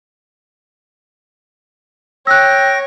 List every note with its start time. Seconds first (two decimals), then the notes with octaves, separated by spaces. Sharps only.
2.27 C#5 G5 E6 F#6 A#6